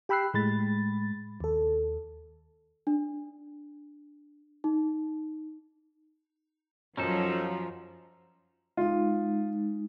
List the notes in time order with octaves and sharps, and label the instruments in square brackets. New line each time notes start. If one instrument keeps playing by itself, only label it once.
[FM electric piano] G4 G5 B5 E6 F#6 C7
A2 G#3 B5 A6
D#2 A4
[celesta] D4
D#4
[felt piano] F#2 [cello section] F3 F#3 [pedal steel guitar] C#4 D#4 A4
[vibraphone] G#3 D#4 [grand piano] F4